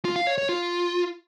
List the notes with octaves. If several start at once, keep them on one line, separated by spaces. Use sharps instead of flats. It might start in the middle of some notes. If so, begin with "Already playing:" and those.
F4
F5
C#5
C#5
F4